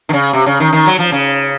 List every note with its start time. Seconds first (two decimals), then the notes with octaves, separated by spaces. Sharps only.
0.09 D#3
0.13 C#3
0.33 C3
0.46 C#3
0.60 D#3
0.73 D#3
0.86 F#3
0.99 F3
1.12 C#3